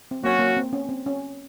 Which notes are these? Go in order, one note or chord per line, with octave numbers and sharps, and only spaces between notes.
C4
F#3 A#3 C#4 F#4
A#3
C4
C#4
C4
C#4